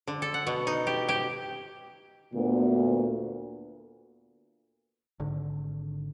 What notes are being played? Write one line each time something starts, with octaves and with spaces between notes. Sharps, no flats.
D3
A4
F#5
B2
D#4
G4
G4
D2 A#2 B3
G#1 D3